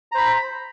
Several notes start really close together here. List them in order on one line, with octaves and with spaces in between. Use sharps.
A#5 C5 B5